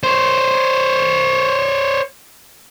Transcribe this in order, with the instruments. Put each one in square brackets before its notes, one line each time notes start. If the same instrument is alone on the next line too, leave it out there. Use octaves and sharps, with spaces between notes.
[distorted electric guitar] C5 C#5